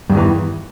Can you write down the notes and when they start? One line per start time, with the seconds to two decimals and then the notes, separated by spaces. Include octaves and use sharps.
0.10 G2
0.12 E2
0.15 D#3
0.17 E3